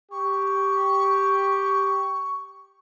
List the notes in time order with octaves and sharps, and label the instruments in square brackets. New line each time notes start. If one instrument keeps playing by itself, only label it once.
[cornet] G4 [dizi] C#6